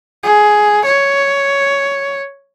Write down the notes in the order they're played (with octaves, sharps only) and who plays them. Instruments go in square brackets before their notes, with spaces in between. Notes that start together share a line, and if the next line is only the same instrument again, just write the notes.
[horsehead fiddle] G#4
C#5